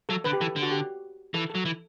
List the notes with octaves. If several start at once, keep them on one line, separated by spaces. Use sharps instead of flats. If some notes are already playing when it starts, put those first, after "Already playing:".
F#3 A4
D3 B4
G4
E3 A4
D3
F#4
G4
E3 A4
F#3 A4
E3